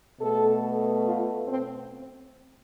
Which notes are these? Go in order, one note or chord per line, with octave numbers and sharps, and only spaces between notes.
B2 A3 A4
F4
C4